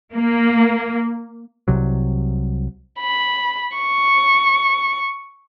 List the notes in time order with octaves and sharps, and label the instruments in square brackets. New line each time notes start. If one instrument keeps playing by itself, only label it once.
[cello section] A#3
[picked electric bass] C2 C3 F#3
[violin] B5
C#6